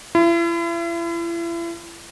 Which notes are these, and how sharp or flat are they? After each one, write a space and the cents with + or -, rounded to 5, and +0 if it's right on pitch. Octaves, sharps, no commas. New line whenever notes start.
E4 +40